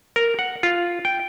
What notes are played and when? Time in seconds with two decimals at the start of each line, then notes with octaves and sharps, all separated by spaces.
0.16 A#4
0.39 F#5
0.63 F4
1.05 G5